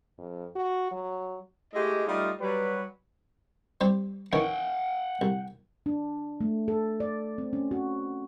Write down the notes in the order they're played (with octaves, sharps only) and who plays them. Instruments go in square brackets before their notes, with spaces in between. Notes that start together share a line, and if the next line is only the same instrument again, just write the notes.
[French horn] F2
F#4
F#3
[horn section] G#3 A3 E4 G4 D#5
G3 A3 D#4 F4
F#3 G3 B4
[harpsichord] G3 C4 G4
[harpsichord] D#3 E3 C#4 [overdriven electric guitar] F#5 G5
[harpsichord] C2
[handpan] D4
A3
A4
D5
C4
C#4
F#4